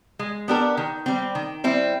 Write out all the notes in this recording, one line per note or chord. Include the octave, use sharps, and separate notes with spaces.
G#3
B3 D4 G4 A#4
D#3
G3 C4
D#3
G3 C4 E4